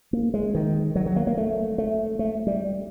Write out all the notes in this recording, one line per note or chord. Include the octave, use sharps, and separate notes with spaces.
A#3
G#3
D#3
F#3
F#3
A#3
A#3
A3
A3
A3
G3